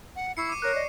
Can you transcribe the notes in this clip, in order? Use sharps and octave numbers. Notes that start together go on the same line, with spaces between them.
F#5
E4 C#6 C7 C#7
D6 D#7
A#4 C#5 F#6
D5 D#5